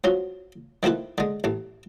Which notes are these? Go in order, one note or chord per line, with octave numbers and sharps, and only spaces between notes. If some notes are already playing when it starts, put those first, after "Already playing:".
F3 F#3 C#4
D#3 F3 A3 E4 B4
D3 G#3
A1 A3